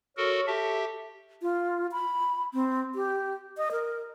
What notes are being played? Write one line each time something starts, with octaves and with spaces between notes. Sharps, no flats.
F#4 A4 A#4 C#5
G4 A4 E5
F4
B5
C4
G4
D#5
A#4